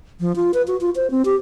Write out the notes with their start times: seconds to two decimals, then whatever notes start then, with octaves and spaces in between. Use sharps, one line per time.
0.20 F3
0.36 F4
0.54 B4
0.68 F#4
0.81 F4
0.96 C5
1.11 C4
1.25 G4